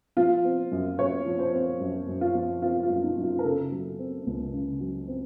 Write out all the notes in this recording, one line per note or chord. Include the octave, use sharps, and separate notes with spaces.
F3 F4
C4
F#2
F#2 C#5
F3
C5
C4
F#2
F#2
F4
F3
C4 F4
F4
F#2
D#4
F#2
F4
A#4
C#3 A4
F#3
C4
C#2
C#3
F#3
C4